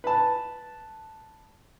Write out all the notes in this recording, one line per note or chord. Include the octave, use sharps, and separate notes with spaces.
B4 A5